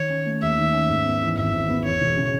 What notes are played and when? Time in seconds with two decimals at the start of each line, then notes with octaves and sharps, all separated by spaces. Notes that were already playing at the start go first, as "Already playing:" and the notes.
Already playing: D#3 D#4 C#5
0.09 C#4
0.26 A3
0.42 D#2 E5
0.58 D#3
0.73 C#4
0.89 G#2
1.05 B3
1.22 E3
1.37 G#1 E5
1.53 G#2
1.69 B3
1.85 E2 C#5
2.01 E1
2.17 C#3